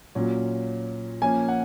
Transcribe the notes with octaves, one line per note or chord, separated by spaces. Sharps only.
A#2 F#3 C#4
F3 A#3 C#4 G#5
F#5